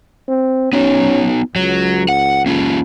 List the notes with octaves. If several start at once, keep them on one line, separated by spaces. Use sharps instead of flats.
C4
B3 C#4 D#4 F#4
C#2 F#3
F#5
A#3 C#4 F4